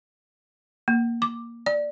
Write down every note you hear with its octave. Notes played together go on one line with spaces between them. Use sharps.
A#3
D6
D5